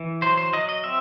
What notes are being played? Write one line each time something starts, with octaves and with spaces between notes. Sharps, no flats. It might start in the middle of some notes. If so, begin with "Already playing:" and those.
Already playing: E3
F#3 C5
C5
F#3 D#5
D#5
C4 E5